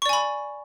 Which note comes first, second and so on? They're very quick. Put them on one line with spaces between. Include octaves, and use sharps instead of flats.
C#6 D5 G#5 B5